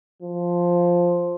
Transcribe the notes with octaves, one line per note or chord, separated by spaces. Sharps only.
F3